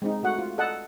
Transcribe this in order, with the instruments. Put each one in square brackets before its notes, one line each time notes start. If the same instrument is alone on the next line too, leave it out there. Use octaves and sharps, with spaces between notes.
[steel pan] G#3 C4 D#4
A3 F#4 F#5
F4
A4 D#5 F#5 A5